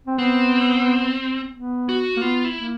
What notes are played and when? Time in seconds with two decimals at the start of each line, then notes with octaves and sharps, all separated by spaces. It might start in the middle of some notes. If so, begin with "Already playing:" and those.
0.07 C4
0.18 B3 C4
1.54 B3
1.89 F#4
2.17 A#3
2.22 B3 F4
2.45 E4
2.56 A#3